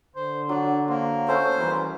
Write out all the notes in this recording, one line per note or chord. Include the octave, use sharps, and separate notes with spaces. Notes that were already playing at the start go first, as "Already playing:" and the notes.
D3 C5
F#3 D4
A#3 C5
A3 C#4 A4 C5
C2 E3 C#4 A#4 B4